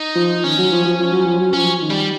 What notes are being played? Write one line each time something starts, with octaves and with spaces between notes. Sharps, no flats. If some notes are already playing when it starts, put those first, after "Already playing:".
Already playing: D#4
F3
D#3 C#4
F#3
F3
F3
F3
F#3
F3
F#3
F3 C#4
D#3
G3